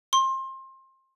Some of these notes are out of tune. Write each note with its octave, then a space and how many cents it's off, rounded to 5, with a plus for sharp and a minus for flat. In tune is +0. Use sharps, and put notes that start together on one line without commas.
C6 +25